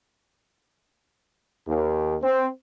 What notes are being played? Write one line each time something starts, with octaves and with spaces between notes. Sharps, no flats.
D#2
C4